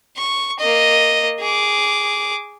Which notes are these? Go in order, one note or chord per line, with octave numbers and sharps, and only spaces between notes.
C#6
A#3 D#5
G#4 D6